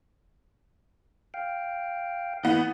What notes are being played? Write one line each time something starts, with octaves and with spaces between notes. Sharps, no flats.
F5 G5
E3 B3 G6